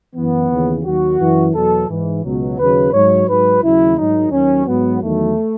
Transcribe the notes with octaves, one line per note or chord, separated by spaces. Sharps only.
F#2 E3 B3
D#2 C#3 E3
D#2 D#3 F#3 F#4
F#2 E3
E2 B2 F#3 A4
G#2 E3
C#2 B2 F#3
D#2 C#3 F#3 B4
G#2 F#3 C#5
G#2 F#3 B4
D#2 C#3 F#3 E4
G#2 D#3 F#3 D#4
D#2 D#3 F#3 C#4
G#2 F#3 B3
E2 D#3 F#3 A3